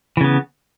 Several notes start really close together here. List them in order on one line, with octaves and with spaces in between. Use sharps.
E3 C#3 B3